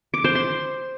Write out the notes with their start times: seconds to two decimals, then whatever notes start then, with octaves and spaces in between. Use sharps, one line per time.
0.14 D6
0.24 C5
0.35 C6